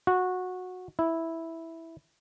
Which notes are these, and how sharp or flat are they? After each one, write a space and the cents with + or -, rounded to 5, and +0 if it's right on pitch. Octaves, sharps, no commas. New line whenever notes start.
F#4 -15
E4 -5